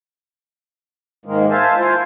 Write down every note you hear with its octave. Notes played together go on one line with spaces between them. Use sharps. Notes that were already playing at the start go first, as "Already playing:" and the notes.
G#2 D#3 G#3 A#3
C5 E5 F5 G#5 A5
E4 F4 C5 G#5